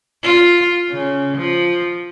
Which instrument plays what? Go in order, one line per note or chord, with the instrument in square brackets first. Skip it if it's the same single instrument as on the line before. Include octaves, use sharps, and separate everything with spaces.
[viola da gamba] F4
C#3
F3